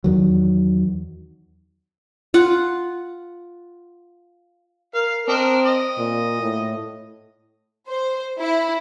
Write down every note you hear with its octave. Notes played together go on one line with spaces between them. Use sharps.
E2 D#3 F#3
F4 F#5
A#4 F5
C4 D4 A#4 D#5
D#5
A#2
A2
C5
E4